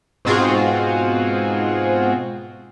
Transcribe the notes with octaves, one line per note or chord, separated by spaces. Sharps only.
G#2 B2 C4 F4 F#4 G#4